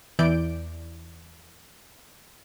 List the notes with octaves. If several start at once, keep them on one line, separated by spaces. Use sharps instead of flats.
E2 E3 D5 G6 D7